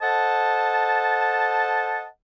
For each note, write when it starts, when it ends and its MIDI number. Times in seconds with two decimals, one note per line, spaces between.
0.01 2.05 69
0.01 2.05 72
0.01 2.05 75
0.01 2.05 78
0.01 2.05 81